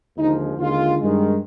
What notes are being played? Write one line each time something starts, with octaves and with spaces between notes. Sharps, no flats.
D#2 D3 F3 G#3 D#4
D#2 D3 G#3 F4
G2 D#3 G#3